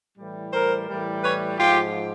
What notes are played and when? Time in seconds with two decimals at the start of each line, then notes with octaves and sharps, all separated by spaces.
0.17 A2 E3 G3
0.53 A#4 C5
0.88 A2 E3 G3
1.23 B4 C#5
1.58 G#2 F3 F4 G4